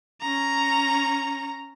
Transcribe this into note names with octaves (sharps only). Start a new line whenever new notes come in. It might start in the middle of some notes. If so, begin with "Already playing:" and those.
C#4 A#5